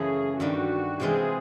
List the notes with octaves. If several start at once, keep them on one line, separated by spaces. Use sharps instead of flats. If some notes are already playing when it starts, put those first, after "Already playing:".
Already playing: F#2 C#3 E3 A3 C#4 G#4
G2 D#3 G3 F#4
C3 E3 G#3 C4 F4 G#4